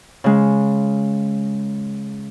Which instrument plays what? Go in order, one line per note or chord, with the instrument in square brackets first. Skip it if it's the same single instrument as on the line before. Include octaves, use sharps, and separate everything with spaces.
[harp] C#3 G#3